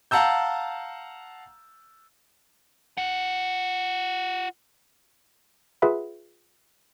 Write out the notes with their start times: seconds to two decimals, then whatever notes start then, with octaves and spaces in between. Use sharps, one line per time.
0.11 F5 F#5 A5 A#5 E6 G6
2.98 F4 F#5
5.82 F4 G#4 B4 E5 F#5 B5